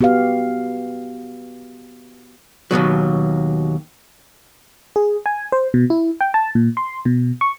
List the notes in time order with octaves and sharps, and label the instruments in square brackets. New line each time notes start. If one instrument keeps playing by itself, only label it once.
[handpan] B3 F#4 G4 B4 F5
[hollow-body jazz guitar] D#2 G#2 B2 F#3
[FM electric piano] G#4
G#5
C5
B2
E4
G5
A5
A#2
C6
B2
C#6